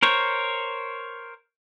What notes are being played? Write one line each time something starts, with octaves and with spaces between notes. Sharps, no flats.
A#4 C5 C#5